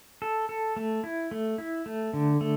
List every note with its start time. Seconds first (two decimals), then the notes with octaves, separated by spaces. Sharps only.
0.22 A4
0.49 A4
0.76 A3
1.04 E4
1.31 A3
1.58 E4
1.86 A3
2.14 D3
2.41 A3